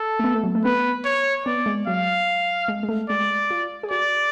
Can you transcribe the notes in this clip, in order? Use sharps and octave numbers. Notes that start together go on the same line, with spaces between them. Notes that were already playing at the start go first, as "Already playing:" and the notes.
Already playing: A4
A3
B3
A3
F#3
A3
B3 B4
C#5
B3 D5
G#3
F#3 F5
G#3
G#3
A3
G#3 D5
F4
G#4
F#4 D5